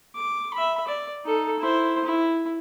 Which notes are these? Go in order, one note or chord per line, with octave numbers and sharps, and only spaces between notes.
D6
E5 B5
D5
D#4 A4
E4 C5
E4